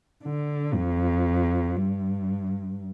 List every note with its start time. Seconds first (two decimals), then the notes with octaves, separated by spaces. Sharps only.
0.24 D3
0.75 F2
1.77 G2